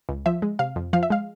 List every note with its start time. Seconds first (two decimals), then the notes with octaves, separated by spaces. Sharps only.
0.09 C#2
0.26 F3 E5
0.42 G#3
0.59 C3 F5
0.76 F2
0.93 F3 F5
1.03 E5
1.10 G#3 F5